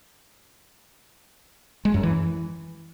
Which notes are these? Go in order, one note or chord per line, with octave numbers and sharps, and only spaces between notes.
G#3
F#2
E3